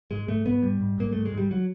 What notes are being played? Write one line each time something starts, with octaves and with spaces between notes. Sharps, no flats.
G#2 G#3
G#2 A3
G#2 B3
G#2 G3
G#2
G#2 A#3
G#2 A3
G#3
G#2
G3
F#3